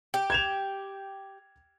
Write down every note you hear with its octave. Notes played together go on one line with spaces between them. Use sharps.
G4
G#6 E7 F7